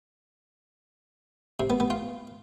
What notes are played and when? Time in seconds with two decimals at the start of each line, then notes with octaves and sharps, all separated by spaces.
1.60 C3
1.70 B3
1.80 B3
1.90 F4